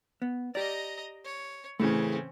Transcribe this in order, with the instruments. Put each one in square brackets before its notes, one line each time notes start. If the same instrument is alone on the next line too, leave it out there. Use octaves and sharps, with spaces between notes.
[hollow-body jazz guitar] B3
[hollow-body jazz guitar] G4 D5 [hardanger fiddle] D#5 A#5
[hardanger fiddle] C#5
[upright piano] A2 C#3 E3 [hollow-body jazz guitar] A3 [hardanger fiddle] C4 C#4